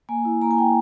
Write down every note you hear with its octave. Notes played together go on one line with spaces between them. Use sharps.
A#3 G#5
E4
A#3 A#5
G#5
E4 G5